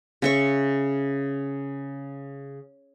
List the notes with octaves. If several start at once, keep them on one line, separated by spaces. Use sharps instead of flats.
C#3 E5 C#6